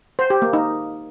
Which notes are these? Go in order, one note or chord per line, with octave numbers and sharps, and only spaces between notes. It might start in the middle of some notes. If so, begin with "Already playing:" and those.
C5
G4
A#3
D#4